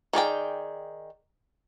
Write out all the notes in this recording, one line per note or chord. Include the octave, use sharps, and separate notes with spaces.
D#3 G#4 D5 G5